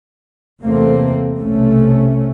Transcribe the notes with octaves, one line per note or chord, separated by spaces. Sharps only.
E2 C3 A3 A#3 C4
B1 C3 A3 C#4